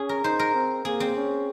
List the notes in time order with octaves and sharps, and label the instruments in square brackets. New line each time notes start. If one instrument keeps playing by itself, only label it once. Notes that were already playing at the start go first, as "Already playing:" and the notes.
Already playing: [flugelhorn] C#4 [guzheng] G#4
[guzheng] A#4
[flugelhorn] D#4 [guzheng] C5
[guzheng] A#4
[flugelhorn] C4
[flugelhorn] A#3 [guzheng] G#4
[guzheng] C4
[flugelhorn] C#4